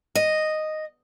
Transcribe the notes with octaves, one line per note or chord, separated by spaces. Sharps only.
D#5